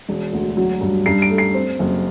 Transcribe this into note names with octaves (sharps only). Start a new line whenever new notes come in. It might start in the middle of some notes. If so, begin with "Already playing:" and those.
E1
D2
F#3
G2
G2 C7
D7
A3
C7
C4
F#1